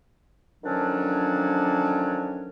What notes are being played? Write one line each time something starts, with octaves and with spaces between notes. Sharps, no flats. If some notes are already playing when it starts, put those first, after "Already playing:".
D3 D#3 F3 F#3 C#4 D4